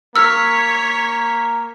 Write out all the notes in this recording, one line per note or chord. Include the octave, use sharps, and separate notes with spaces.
A#3 C#5 E6 F6 B6